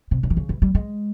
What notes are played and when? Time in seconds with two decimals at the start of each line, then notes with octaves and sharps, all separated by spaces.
0.11 C3
0.23 C#3
0.30 E3
0.37 C#3
0.49 E3
0.62 G3
0.75 G#3